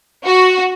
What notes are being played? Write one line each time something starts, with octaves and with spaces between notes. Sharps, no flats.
F#4